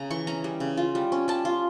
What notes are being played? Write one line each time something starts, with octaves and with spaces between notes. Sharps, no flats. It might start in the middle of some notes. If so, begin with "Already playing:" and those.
Already playing: C#3 C#4 A#5
E3 C#6
C#4 A#5
G3
C#3
F4
G3
C#4
G3 A5
F4